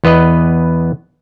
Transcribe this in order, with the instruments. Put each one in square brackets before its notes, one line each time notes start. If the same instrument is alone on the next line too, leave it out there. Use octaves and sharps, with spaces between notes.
[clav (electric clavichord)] E2 B3 B4 D#5